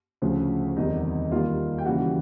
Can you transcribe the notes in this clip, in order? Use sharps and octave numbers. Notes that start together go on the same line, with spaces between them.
D2 C#3 F3
E2 C3 D#3 G3 D#4 D#5
D#2 D#3 G3 A#3 D#4 F4 F5
G5
D#2 C#3 E3 G3 F#4 F#5